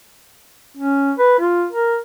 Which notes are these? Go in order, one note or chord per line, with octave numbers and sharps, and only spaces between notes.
C#4
B4
F4
A#4